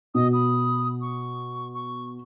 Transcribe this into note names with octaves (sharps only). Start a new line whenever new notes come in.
B2 D#5 D#6
B5 D#6
C#6
C#6